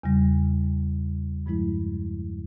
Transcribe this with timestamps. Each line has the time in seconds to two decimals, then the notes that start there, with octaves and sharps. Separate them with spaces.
0.03 E2 C#3 G3
1.46 G2 F3 G#3 E4